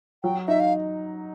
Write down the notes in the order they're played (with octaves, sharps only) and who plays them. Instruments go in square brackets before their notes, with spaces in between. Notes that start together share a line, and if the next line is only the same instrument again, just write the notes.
[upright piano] F#3 [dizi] G5
[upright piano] D#4 [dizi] E5
[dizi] F5